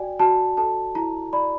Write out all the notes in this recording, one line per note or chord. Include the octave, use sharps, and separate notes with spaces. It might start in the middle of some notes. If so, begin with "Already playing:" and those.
Already playing: F#4 D5 G5 G#5
F#4 A5
A4 A5
E4 A#5
D5 B5